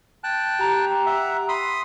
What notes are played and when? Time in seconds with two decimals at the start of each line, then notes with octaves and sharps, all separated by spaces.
0.24 G5 A5 F#6
0.60 G4 A#5
1.06 E5 F#5
1.49 B5 C6 D#6